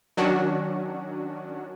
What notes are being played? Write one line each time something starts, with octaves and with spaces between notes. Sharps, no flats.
D#3 F#3 C#4 D4 F#4